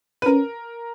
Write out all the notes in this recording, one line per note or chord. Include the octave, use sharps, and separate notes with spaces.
B4
C#4 A#4